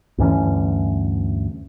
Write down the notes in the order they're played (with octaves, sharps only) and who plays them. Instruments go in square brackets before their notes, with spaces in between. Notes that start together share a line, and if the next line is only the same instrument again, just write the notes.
[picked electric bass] D2 G2 E3 C#4